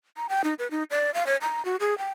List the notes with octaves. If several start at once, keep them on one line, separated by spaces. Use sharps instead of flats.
A#5
G5
D#4
B4
D#4
D5
F5
C#5
A#5
F#4
G#4
G5